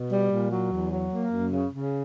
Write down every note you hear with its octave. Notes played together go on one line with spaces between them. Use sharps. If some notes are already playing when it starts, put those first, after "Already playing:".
Already playing: B2
G3
A#2
F#3
E2
F#3
A#3
F#2
C#3
C#3